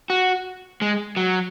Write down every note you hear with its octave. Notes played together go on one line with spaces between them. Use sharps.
F#4
G#3
F#3